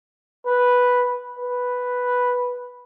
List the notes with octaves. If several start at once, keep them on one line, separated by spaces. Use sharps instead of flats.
B4
B4